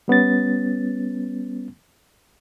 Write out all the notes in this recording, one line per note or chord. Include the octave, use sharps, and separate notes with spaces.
G3 B3 C#4 A6